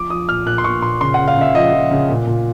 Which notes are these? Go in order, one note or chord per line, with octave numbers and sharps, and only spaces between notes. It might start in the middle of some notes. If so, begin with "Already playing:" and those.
Already playing: F3 D6
F3 D#6
A#2 F6
A#2 F#6
C6
A#2 C#6
A#2 C6
C#3 C6
C#3 F#5
F5
C#3 E5
F3 D#5
F3
C#3
A#2
A#2